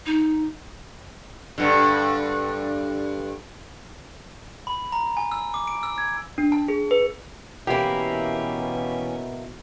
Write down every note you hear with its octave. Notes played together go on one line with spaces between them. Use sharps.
D#4
G2 D3
B5
A#5
G#5
E6
D6
D7
E6
G#6
D4
A5
G#4
B4
B2 E3 A#3 C#4 E4 G4 E5